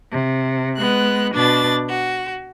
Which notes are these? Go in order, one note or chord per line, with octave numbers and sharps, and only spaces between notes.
C3
G#3 B3 F#6
B2 D4 B4 A6
F#4